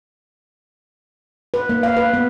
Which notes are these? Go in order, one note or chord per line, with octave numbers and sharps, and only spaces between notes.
B4
A#3
F5
B4
B3